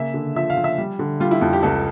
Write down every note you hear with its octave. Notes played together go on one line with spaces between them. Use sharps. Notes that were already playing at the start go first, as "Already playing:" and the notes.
Already playing: C#3 A#3 E5
D3
F3 E5
F5
F3
E5
G3
D3
G3 F4
E4
F2 F4
G4
C#2 A4